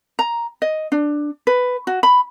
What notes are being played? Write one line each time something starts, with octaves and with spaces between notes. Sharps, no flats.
A#5
D#5
D4
B4
F#4
B5